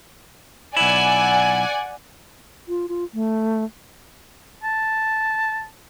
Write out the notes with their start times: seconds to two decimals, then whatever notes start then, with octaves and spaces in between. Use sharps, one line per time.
0.77 B1 E4 D5 F#5 G#5
2.68 F4
2.89 F4
3.14 A3
4.63 A5